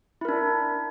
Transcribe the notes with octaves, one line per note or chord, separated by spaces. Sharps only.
D4 E4 A#4